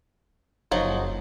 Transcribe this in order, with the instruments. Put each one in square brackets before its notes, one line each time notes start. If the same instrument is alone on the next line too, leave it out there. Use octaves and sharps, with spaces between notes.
[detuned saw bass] F#1 [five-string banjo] F3 F#3 D#4